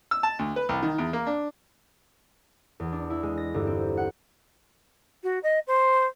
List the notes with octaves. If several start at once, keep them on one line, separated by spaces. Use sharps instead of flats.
E6
A5
D2
B4
C2
D#3
E2
A#3
D4
E2
D4
E4
G#3
A#6
G1
C4
F#5
F#4
D#5
C5